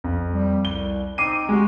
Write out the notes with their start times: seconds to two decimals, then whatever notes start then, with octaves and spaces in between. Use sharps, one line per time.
0.04 F2
0.33 G3
0.65 C2 G7
1.18 C4 D#4 D6 C7 D#7
1.49 G#3 F#4 G4